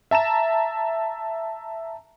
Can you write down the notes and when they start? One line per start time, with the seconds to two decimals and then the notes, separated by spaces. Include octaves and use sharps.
0.11 E5 A5 A#5 E7